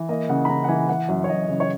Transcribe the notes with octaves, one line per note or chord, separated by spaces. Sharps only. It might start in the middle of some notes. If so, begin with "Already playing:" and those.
Already playing: E3
A#3 D#5
C#3 F#5
B5
C#3 A#5
F#5
E3 G#5
E3 F#5
F#2
C#5
F#2 D#5
C#3
C#5